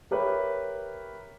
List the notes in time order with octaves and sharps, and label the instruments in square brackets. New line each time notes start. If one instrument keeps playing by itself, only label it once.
[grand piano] G4 A#4 B4 C#5 E5